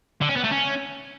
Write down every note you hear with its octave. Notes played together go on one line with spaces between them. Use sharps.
D3
C#4
B3
A3
C#4